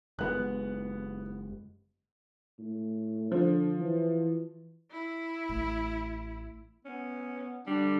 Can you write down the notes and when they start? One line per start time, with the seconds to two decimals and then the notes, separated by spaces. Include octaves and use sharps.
0.19 F#1 G#3 B3 F#6
2.59 A2
3.32 D3 F3
3.80 E3
4.91 E4
5.49 A1 A3
6.85 B3 C#4
7.67 D3 G3 D4